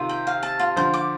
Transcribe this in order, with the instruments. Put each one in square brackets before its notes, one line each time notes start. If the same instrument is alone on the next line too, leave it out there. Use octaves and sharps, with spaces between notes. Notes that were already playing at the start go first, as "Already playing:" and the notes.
Already playing: [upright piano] C3 D#3 [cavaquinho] F4
[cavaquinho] G5
F5
A5
F4
[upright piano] D3 F3 [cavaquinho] C5
[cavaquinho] D6